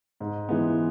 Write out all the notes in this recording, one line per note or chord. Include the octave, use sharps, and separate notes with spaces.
G#2
E3 G#3 B3